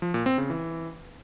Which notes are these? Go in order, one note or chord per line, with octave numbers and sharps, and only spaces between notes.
F3
A#2
C4
C#3
E3